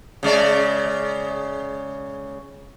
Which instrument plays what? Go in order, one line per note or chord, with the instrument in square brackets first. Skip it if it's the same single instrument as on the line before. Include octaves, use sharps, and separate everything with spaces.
[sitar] C#3 G#3 D5